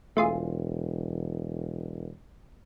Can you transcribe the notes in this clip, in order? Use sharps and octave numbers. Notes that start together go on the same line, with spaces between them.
E1 A3 F4 G#4